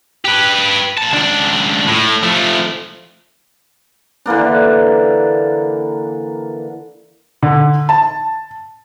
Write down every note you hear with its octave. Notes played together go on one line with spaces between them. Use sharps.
G4 B4
A#2 A5
C#2 D4
A2
F3 A3
D3 E3 A#3 D4
D3
A5